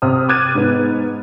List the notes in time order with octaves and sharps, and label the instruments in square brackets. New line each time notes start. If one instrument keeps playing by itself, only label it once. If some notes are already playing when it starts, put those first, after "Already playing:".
[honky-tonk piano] C3 C4 D#6 F6
D6 F#6 G#6 A6 D#7
G#2 B3